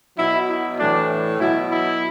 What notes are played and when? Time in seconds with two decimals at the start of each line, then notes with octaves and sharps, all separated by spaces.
0.17 B2 F#3 E4
0.48 E4
0.78 A2 E3 D4
1.39 B2 F#3 E4
1.70 E4